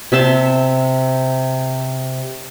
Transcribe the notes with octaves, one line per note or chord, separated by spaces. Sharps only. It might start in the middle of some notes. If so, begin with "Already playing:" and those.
C3 E5 A5 C6